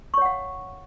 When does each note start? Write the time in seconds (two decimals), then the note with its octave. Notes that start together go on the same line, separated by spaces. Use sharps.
0.14 C#6
0.18 C#5
0.22 F#5
0.26 F5